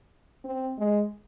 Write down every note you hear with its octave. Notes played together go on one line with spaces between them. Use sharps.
C4
G#3